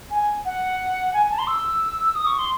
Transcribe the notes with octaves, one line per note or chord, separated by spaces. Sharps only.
G#5
F#5
G#5
A5
C6
E6
D#6
C#6
C6